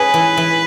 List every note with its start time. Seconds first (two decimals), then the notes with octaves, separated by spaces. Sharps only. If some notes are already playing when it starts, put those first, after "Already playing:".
Already playing: G#3 C#4 G#4 B4
0.14 E3
0.37 E3